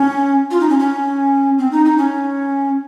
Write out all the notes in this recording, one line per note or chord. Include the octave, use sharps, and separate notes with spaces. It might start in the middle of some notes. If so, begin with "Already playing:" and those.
Already playing: C#4
F4
D#4
C#4
C#4
C4
D#4
D#4
C#4